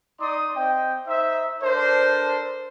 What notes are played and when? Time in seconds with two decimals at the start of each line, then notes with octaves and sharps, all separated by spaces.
0.21 D#4 D5 C6 D6 D#6
0.55 C4 D#5 G5
1.08 D#4 C5 E5
1.63 D4 A4 A#4 C5